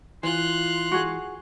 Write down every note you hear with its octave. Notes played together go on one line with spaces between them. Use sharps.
E3 F4 C6 F#6
F#4 G#4